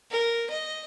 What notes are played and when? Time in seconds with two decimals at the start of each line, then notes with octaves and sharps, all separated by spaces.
0.11 A#4
0.50 D#5